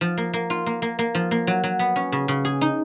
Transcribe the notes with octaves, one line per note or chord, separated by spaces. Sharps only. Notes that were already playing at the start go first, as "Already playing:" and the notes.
F3
A#3
A#3
F4
A#3
A#3
A#3
F3
A#3
F#3
F#3
B3
C#4
C#3
C#3
G#4
D#4